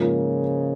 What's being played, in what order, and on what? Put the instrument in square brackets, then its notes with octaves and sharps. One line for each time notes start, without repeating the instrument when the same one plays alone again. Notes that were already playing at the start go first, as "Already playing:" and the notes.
Already playing: [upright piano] G#2 F3 A#3 F4 [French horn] C#3